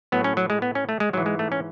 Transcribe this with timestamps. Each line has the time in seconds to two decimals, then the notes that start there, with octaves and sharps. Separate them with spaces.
0.12 A2 F#3 B3
0.24 C#4
0.37 F#3
0.50 G#3
0.62 B3
0.75 C#4
0.89 A3
1.00 G#3
1.13 G#2 E3 F#3
1.26 G#3
1.39 A3
1.52 C#4